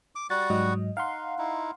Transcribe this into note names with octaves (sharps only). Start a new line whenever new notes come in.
D6
G3 F#4 F#5 A6
G#2 F#3 D#5
D#4 F5 F#5 C6
D#4 E4